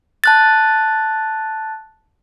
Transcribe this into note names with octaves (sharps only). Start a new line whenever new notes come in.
A5 F#6 A6